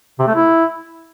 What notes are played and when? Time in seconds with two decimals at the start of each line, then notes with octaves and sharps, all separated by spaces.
0.19 C3
0.27 A3
0.35 E4